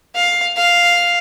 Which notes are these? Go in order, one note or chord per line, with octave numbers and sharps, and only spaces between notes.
F5
F5